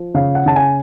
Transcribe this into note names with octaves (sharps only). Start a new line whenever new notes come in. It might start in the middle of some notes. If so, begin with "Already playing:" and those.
Already playing: F3
C#3 F5
F#5
C#3 A5
G#5